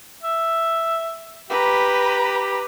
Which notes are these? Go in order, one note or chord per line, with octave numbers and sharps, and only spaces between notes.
E5
G4 B4 A#5